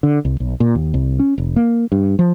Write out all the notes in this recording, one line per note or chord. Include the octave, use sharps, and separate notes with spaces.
D3
C2
B1
A#2
D#2
C2
C#4
F1
A#3
G2
F3